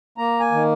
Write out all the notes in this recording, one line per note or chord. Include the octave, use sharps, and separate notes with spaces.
A#3 A#5
G#5
D#3